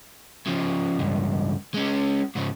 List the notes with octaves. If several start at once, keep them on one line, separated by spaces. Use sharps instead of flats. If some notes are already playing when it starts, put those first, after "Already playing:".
C#3 F3
C#2 G2
G#3 C#4
G#2 C#3